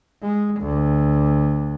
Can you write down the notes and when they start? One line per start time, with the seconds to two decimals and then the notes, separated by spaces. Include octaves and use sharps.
0.23 G#3
0.61 D2